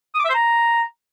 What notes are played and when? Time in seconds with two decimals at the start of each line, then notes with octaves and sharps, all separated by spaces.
0.14 D#6
0.19 D6
0.24 E5
0.29 C5
0.34 A#5